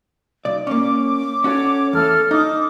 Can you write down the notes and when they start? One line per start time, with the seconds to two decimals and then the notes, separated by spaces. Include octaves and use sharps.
0.45 B1 D5
0.67 A#3 C#4 D6
1.44 C#4 F#4 A4 C#5
1.93 E2 A3 A4 F6
2.31 D#4 D6 D#6